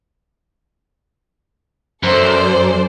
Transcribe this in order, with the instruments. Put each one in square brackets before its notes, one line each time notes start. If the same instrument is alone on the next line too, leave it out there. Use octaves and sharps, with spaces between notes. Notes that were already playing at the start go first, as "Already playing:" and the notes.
[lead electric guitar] F#2 [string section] A4 C5 D5